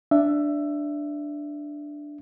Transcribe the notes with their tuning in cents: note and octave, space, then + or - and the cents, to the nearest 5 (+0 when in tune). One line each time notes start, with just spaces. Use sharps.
D4 +0 E5 +15